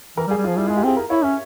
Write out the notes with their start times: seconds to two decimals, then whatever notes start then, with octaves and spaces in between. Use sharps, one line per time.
0.17 E3 A#4
0.27 G3
0.31 G#4
0.37 G3
0.44 F4
0.47 F3
0.57 G3 E4
0.67 E4
0.70 G#3
0.77 G4
0.84 C4 G#4
0.97 A#4
1.10 E4 C#5
1.23 C#4 E5